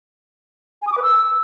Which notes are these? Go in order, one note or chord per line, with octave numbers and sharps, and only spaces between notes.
G#5
D#6
D6
B4
E6